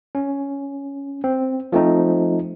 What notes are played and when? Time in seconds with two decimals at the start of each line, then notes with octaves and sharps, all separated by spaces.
0.15 C#4
1.24 C4
1.72 F3 A3 C4 D#4